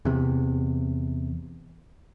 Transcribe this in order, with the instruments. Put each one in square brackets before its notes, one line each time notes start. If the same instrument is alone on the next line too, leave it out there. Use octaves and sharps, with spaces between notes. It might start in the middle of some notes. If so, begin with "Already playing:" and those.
[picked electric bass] E2 C3